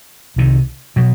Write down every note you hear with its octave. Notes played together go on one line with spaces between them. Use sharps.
C2 C3 D#3
B2 F#3